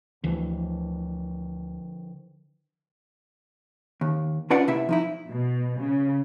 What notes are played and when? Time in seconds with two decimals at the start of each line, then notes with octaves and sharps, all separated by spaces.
0.24 D2 D3 E3 F3
4.01 D#2
4.50 C#4 D4 F4 B4 D5 F#5
4.68 C3 A#3 E4 E5
4.89 F3 D#4 E4
5.30 B2
5.79 C#3